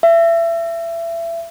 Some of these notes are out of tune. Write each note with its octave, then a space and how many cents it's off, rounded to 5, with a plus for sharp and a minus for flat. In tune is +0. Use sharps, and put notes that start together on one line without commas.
E5 +30